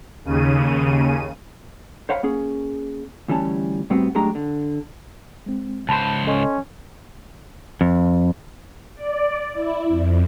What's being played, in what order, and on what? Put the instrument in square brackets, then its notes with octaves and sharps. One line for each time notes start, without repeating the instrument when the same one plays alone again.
[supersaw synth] D#2 C#3 D#7
[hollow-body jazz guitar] C5 C#5 F5 F#5 B5
A#3 C#4 G#4
D2 E3 G3 C#4 A5
A2 G3 B3 C4 F#4
F#2 G#3 A3 D4 G4 A#5
D3
[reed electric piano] G#3 C4
[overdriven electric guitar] C#2 C5 [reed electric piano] A5 B5 C6
[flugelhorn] C#4 [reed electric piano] A4 D#5 C6
[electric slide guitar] F2
[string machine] D5
E4
F2